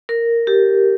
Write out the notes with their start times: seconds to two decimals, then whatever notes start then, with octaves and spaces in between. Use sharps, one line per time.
0.09 A#4
0.47 G4